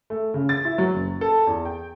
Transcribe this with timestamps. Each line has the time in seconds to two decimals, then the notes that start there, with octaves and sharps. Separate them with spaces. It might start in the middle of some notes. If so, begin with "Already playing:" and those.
0.10 A3
0.34 C#3
0.49 A6
0.65 E4
0.78 F#3
0.94 F#1
1.21 A4
1.47 E2
1.65 G5